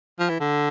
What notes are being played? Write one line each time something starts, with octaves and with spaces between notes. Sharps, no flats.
F3
E3
D3